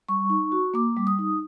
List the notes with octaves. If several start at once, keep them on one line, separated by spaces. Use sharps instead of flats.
G3 C#6
D#4
F#4
A#3 D6
G3
D#6
D#4